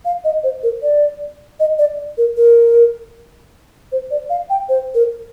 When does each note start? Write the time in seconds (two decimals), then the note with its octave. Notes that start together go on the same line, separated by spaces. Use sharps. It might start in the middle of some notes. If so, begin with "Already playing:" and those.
0.05 F5
0.24 D#5
0.44 C5
0.63 A#4
0.82 D5
1.60 D#5
1.79 D5
2.18 A#4
2.37 A#4
3.92 C5
4.11 D5
4.30 F5
4.50 G5
4.69 C5
4.95 A#4